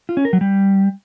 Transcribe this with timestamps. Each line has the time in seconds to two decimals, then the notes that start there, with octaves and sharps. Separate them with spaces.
0.09 F4
0.17 C#4
0.25 A#4
0.33 F#3
0.41 G3